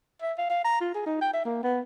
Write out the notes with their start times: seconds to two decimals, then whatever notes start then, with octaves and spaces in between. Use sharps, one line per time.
0.22 E5
0.38 F5
0.50 F5
0.64 A#5
0.80 F4
0.95 G#4
1.06 D#4
1.21 G5
1.33 E5
1.45 A#3
1.63 B3